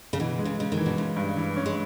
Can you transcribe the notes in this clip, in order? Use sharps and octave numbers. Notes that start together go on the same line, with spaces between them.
C#3
B2 E3
G#3
C#3
C#3 G#3
D#3
E3
B2
C#3 G#3
G2
E3
C#4
G#3